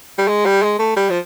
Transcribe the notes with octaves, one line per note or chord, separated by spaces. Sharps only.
G3
G#3
G3
G#3
A3
G3
F3